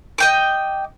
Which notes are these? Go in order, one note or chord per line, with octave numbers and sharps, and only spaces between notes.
D#5 G5 D6